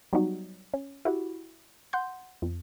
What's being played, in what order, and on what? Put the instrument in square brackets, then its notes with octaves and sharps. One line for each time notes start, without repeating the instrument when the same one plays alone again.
[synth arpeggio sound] F#3 G3 B3 D#4 F#4
C#4
E4 F#4 G4
F#5 C6 G6
F2